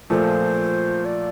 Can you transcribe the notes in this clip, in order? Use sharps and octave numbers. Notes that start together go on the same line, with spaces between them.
A#2 F3 A3 C5
D5